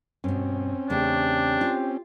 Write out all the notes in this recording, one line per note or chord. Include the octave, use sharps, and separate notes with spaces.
G2 B2 C4 C#4
E2 C#3 A3 D4 G4
F4